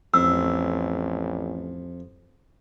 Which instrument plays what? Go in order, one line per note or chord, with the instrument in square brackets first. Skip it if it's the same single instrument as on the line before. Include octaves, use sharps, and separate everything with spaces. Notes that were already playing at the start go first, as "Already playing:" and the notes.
[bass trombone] A1 [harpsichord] F2 [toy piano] E6